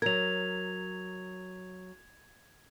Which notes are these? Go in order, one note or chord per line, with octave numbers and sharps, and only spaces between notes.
F#3 A#4 G#6 F7